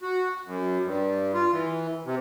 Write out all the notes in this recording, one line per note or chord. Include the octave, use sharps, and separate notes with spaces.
F#4
F#2
G2
F4
E3
C3